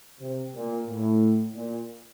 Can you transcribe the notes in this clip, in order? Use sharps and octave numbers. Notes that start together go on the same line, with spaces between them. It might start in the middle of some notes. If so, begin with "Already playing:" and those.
C3
A#2
A2
A#2